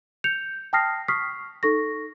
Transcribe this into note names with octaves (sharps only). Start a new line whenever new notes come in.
G6 C#7 F7
G5 A5 D#6 F6 A#6 C7
C#6 D#6 F6 B6 C7
D#4 A4 C#6 A#6